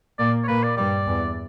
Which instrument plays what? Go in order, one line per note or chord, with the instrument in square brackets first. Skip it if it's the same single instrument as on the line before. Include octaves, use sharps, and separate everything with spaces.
[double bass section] A#2 A#3 [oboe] D5
[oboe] C#5
[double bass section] A#2 A#3 [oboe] B4
[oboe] D5
[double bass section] G2 G3 [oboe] D5
[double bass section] E2 E3